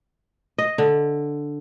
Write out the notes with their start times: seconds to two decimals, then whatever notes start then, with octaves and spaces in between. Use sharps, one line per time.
0.58 D#5
0.78 D3